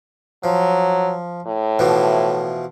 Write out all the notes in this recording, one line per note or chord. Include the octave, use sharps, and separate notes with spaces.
F3 F#3
A2
B2 E3 F3